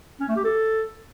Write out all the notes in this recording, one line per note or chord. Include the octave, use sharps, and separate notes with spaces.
C#4
A3
G4
A4